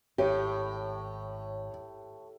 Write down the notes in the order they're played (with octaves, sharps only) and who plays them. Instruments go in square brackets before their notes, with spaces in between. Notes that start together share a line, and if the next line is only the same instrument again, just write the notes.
[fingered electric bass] G#1 [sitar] A2 [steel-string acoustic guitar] G4 [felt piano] C#5